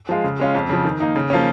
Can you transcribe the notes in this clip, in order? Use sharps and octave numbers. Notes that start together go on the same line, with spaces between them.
F3 G#3 F4
C#3
G#3 C#4 F4
F2
C#3 F3
D#3
A#3 D#4
C#3
F3 A#3 C#4